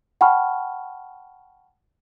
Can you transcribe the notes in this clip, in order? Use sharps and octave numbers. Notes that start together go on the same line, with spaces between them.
F#5 G5 A5 B5 C#6 F6